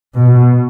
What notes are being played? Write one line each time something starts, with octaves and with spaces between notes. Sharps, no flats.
B2